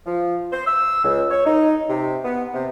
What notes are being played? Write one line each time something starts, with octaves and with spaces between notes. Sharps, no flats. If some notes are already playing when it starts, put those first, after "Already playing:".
F3
C5
E6
C#2
C#5
D#4
C3
B3
C3